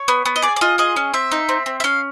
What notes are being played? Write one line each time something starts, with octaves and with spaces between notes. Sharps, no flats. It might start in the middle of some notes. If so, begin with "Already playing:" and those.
Already playing: C#5
B3
B3
D#5
G#4 D5
D5
F4 D#5
G#4 D#5
C#4
C4 E5
D#4
C4
C4
E5
C#4 F5